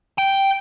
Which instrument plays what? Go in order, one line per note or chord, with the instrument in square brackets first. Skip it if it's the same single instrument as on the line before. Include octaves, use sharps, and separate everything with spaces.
[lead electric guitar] G5